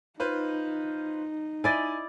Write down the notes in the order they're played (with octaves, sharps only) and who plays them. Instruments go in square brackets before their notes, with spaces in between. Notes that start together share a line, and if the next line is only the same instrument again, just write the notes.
[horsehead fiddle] D#4 [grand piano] F4 B4 C5
[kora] E4 D5 D#5 [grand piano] G#5 A6